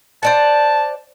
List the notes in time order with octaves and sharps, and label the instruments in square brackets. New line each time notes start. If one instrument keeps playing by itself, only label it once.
[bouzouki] C5 D5 F#5 [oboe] A5